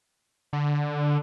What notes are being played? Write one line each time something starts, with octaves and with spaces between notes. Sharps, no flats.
D3